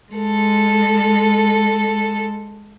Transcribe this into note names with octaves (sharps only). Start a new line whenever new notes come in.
G#3 A4